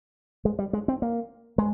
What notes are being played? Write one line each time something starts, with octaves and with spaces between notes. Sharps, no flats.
G#3
G3
G#3
C4
A#3
G#3